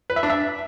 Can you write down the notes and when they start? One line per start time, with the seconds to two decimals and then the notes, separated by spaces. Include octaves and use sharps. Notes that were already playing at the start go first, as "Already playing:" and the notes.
0.10 B4
0.16 E5
0.23 D4
0.30 E5